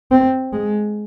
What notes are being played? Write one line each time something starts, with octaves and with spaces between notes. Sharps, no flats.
C4
G#3